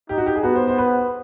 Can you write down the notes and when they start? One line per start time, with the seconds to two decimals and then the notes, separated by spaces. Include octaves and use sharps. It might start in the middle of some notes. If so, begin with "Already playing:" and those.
0.09 D#4 G4
0.18 F#4
0.26 G4
0.36 G#4
0.43 B3 F#4
0.55 C5
0.68 C5
0.78 B4